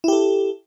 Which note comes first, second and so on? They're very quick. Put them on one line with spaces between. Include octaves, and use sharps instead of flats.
E4 G4 A4